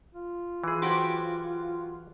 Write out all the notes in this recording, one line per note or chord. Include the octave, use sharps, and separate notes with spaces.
F4
E3 G#4
F#3 F#4 G4 C5 C6